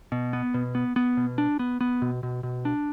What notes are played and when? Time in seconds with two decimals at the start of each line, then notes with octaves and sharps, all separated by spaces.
0.12 B2
0.33 B3
0.54 B2
0.75 B3
0.96 B3
1.17 B2
1.38 D4
1.59 B3
1.81 B3
2.02 B2
2.23 B2
2.43 B2
2.65 D4